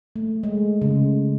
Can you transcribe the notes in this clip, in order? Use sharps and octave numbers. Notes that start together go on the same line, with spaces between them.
A3
G#3
C#3